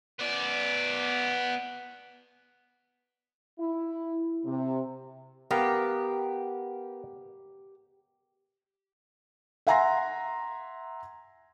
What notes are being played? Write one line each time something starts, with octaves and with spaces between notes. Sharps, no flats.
B3 D5
E4
C3
B3 G4 A#4 F5
E5 F#5 G#5 A#5 C6 A#6